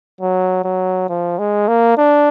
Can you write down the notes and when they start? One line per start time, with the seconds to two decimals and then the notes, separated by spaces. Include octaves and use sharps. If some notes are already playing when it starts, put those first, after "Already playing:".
0.21 F#3
0.64 F#3
1.09 F3
1.39 G#3
1.68 A#3
1.98 D4